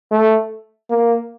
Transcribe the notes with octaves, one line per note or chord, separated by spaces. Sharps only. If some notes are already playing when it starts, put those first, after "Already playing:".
A3
A#3